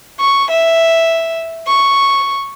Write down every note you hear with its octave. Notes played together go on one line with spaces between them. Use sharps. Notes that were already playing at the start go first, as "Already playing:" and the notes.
C#6
E5
C#6